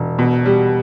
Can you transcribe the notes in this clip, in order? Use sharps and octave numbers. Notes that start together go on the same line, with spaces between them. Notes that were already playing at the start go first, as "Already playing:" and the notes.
Already playing: E1
B2
G3